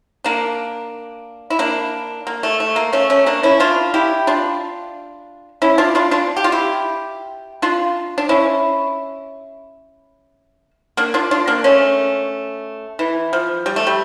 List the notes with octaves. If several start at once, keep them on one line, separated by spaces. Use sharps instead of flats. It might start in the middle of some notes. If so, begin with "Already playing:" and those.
A#3 D4
E4
A#3 D4
A#3
A3
A3
A#3
A3 C#4
A3 C#4
A#3 D4
C#4 E4
D4 F4
E4 G4
D4 F4
C#4 E4
D4 F4
D4 F4
D4 F4
G4
F4
E4 G4
D4 F4
D4
C#4 E4
A#3 D4
D4 F4
D4 F4
A#3 D4
A3 C#4
E3
F3
G3
A3
G3